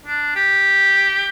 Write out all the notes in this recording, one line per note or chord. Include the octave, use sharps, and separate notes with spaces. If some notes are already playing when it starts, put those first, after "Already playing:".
D4
G4